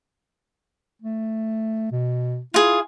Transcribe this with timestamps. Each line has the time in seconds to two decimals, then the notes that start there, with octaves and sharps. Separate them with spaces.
1.02 A3
1.92 B2
2.54 E4 F4 G#4